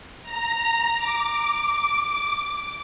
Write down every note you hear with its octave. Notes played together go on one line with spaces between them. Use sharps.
A#5
D6